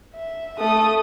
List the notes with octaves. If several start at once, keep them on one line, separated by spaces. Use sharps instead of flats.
E5
A3 D#6